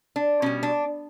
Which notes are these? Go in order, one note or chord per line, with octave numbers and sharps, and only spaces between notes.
D4
B2 G3 C#4
D4